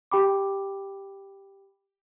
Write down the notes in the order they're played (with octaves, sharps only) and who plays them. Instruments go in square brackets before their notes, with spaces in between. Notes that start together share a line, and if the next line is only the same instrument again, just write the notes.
[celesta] G4 G5 B5 D6